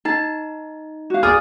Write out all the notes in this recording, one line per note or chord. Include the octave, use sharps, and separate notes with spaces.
D#4 A5
F#4 F5
G#4 D5 F6